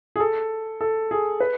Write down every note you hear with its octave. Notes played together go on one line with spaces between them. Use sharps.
G#4
A4
A4
G#4
B4